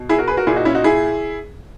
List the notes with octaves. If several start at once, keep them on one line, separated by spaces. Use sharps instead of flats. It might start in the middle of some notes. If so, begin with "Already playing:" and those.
Already playing: B2
E4 G#4
F#4 A#4
G#4 B4
F#4 A#4
A#2 E4 G#4
D#4 F#4
C#4 E4
D#4 F#4
E4 G#4